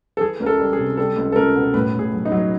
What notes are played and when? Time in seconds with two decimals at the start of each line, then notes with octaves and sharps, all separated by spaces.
0.17 A4
0.21 E3 G#4
0.40 C#2 A#4
0.46 A4
0.59 G3
0.73 G#4
0.78 C3
0.97 G3 A4
1.16 C#2
1.32 A4
1.36 C#2 A#4
1.55 B2
1.74 A2 B4
1.94 A2
1.99 G#4
2.13 F#3
2.25 D#4
2.32 F#3